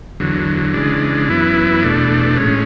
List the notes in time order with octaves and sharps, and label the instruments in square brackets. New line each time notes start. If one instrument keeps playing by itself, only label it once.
[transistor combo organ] E2 D3 F#3
C#3 E3 G#3 D4
F#2 E3 B3 E4
E2 B2 A3 D4
A2 G#3 C#4